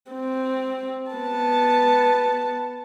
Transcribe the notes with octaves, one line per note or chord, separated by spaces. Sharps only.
C4
B3 A5